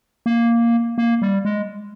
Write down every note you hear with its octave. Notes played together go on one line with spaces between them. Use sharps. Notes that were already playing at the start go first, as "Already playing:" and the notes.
A#3
A#3
G3
G#3